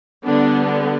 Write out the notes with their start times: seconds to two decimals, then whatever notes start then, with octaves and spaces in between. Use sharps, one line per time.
0.25 D3 G3 B3 D4